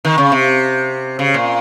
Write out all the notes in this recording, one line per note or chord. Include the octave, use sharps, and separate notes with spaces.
D#3
C#3
C3
C#3
A#2